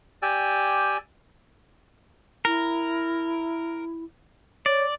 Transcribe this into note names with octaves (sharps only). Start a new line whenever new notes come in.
G4 D5 G5 G#5 E6
E4 A#4
C#5 D5